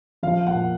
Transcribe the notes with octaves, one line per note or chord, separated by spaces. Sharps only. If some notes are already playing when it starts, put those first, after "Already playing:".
F3 F5
A#2 F#5